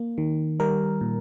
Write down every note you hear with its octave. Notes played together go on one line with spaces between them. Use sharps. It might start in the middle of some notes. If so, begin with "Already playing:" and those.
Already playing: A#3
D#3
G3 A#4
A#2